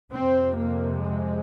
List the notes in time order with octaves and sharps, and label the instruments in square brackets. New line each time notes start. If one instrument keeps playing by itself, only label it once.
[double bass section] F2 C3 C4
A#3
G#3